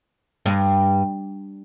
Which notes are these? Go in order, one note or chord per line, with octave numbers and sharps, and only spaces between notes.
G2